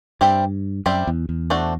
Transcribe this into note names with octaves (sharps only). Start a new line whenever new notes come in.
G2 G3 C4 G4 C5 E5
F#2 G3 C4 G4 C5 E5
E2
E2
A3 D4 F#4 C5